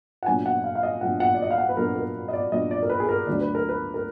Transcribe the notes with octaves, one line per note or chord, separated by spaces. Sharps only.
F#5
A#2 F#3 B3 D4 G#5
F#5
F5
F5
D#5
A#2 F#3 B3 D4 F#5
F#5
D5
D#5
F5
F#5
B4
A#2 F#3 B3 D4 A#4
A#4
D#5
D5
A#2 F#3 B3 D4 D#5
D5
A#4
B4
G#4
A#4
D2 D3 F#3 D4 D5
B4
A#4
B4
A#4